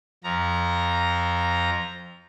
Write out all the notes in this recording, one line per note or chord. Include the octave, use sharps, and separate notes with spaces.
F2 F3 A#5